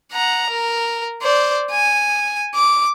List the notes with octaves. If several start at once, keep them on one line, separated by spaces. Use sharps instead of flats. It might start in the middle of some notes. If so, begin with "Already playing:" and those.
F#5 A#5
A#4
C5 D5
G#5
D6